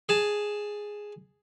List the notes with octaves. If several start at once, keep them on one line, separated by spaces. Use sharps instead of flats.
G#4 A5